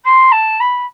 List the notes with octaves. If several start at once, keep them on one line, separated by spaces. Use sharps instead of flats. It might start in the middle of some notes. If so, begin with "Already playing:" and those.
C6
A5
B5